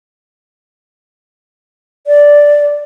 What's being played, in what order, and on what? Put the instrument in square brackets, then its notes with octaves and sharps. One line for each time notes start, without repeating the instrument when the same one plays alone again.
[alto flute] D5